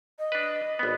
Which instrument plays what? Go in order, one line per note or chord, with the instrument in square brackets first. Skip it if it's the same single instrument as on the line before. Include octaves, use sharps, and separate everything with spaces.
[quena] D#5
[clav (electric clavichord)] D4 B4
G#1 B3